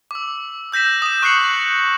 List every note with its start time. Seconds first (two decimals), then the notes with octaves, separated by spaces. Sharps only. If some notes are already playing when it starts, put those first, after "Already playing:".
0.11 D6 E6
0.72 E6 G6 A#6 B6 E7
1.02 D#6 E7
1.22 C#6 F#6 G6 C7 C#7 F#7